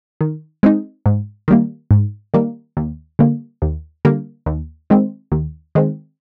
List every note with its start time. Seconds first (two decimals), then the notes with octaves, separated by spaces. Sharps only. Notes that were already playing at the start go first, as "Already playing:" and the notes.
0.21 D#3
0.63 G#3 C4 D#4
1.06 G#2
1.48 D#3 G3 A#3
1.91 G#2
2.34 D#3 G3 A#3
2.77 D#2
3.19 D3 G3 A#3
3.62 D#2
4.05 D3 G3 A#3
4.46 D#2
4.90 D#3 G#3 C4
5.32 D#2
5.75 D#3 G#3 C4